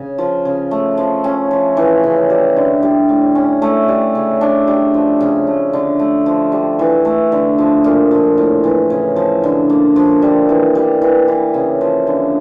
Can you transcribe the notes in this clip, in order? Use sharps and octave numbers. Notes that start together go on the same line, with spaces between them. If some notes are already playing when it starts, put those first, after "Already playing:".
Already playing: C#3
F3
C#3
A3
F3
C#4
F3
E3
C#3
G3
D3
G3
A2
C#4
A3
G3
C#3
D4
G3
F3
C#3
A3
D3
A3
F3
G3
E3
A3
D3
F3
A#2
F3
A2
E3
C#3
F3
D3
A#3
F3
G3
E3
G3
E3
E3
C#3
F3
D3